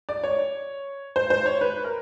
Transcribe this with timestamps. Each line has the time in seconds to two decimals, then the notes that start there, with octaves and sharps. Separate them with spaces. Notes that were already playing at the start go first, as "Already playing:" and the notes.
0.09 D5
0.24 C#5
1.16 C5
1.30 C5
1.46 C#5
1.61 B4
1.84 A#4